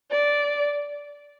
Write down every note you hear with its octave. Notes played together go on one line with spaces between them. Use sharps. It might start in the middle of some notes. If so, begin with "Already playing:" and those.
D5